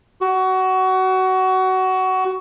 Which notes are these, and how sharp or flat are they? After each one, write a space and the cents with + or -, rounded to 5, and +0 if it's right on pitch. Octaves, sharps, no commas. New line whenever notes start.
F#4 +20